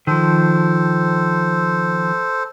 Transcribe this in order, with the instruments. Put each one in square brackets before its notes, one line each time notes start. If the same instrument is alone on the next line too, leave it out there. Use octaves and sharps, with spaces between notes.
[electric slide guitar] D#3 F3 [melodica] A4 C5